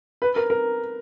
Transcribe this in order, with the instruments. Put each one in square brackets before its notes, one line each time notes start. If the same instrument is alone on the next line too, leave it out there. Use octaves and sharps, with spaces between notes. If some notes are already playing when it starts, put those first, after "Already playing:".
[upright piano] B4
A#4
A#4